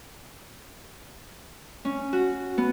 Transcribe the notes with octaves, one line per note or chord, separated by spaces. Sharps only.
C#4
F#4
B3